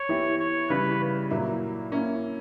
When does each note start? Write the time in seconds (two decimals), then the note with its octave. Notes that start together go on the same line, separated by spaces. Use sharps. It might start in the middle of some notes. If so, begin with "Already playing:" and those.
Already playing: C#5
0.09 E3 B3 E4 G4
0.39 C#5
0.69 C#3 E3 G3 B4
1.30 A#2 F#3 A#3 E4
1.92 A#3 C#4 E4